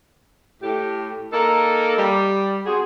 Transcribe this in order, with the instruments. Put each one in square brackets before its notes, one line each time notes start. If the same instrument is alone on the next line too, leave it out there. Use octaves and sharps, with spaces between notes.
[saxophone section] A2 G4
A#3 D#4 A4 A#4
G3
C4 F#4 G#4